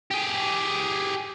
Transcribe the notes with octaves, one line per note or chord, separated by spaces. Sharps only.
G4 G#4